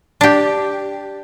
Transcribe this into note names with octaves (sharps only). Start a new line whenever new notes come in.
D4 G4